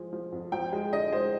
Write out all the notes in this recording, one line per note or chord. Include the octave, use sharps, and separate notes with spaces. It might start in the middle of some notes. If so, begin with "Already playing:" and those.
Already playing: F3 G#3
F3
F2
F3 G5
G#3
D3 D#5
G#3 C5